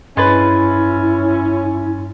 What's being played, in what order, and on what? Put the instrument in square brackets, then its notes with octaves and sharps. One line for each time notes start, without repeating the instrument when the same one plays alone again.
[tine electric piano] G2 C6 A6 [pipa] G#3 B4 [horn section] C#4 [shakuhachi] E4